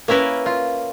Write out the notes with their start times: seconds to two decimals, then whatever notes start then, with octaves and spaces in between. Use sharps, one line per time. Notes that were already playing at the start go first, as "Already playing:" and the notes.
0.08 A#3 C#4 E4 A#4 B4
0.46 F4